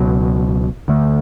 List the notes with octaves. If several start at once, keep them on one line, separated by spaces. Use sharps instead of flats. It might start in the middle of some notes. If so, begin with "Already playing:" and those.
Already playing: C#2 B2 F#3
D2 D3 A3